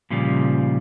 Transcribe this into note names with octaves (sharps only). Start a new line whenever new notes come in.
A#2 C#3 F3 G3